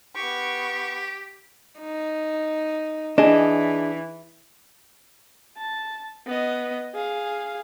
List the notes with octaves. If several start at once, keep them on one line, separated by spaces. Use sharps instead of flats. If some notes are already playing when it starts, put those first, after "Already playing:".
B3 G4 C#6
D#4
E3 D4 G#4 D#5
A5
B3 D#5
G#4 F5